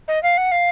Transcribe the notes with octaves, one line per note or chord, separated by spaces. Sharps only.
D#5
F5
F#5
F5